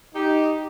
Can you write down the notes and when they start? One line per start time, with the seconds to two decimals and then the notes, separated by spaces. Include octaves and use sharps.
0.15 D#4 G4